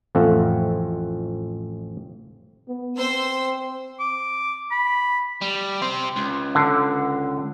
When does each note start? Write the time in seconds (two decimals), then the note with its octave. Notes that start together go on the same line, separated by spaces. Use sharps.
0.15 A1 F2 A3 C4 F4 F#5
2.68 B3
2.98 C4 C5 C6 E6
4.00 D6
4.71 B5
5.42 G3
5.82 G4 C5
6.16 C#2
6.55 D3